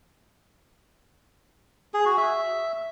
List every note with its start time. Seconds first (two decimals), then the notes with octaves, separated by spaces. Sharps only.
1.94 G#4
2.06 F#4
2.17 E5